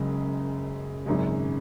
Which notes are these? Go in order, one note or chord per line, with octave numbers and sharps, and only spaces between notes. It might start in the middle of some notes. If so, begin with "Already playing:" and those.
Already playing: F#1 F#2 C#3 G#3
G#1 F#2 C#3 G#3